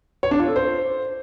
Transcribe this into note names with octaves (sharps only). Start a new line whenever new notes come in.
C#5
D4
F4
A4
C5